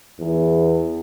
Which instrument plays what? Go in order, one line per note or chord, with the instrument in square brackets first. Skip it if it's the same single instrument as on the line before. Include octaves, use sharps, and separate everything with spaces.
[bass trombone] E2